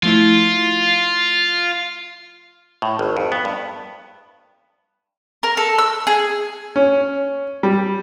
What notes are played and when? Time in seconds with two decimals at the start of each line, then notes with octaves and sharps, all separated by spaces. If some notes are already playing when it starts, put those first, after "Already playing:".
0.03 F3 A3 E4 F4
2.82 A2
2.99 G#1
3.17 F2
3.32 B3
3.45 G2
5.43 A#4
5.57 A4
5.78 E6
6.07 G#4
6.76 C#4
7.63 G3